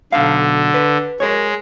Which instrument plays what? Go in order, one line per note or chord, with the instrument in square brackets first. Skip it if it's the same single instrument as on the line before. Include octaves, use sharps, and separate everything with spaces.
[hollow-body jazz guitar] B1 F5 [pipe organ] D3
[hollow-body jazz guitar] B4
[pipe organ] G#3 [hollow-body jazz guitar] A#4 C#5